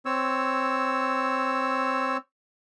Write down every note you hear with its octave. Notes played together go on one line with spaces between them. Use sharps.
C4 C#5 E6